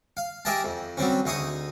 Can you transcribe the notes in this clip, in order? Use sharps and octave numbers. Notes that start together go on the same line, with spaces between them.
F5
G4 G#4 A#4 D#5 E5 A5
F2
F#3 G3 C4 C#4
D2 D#4 G#4 C#6 D#6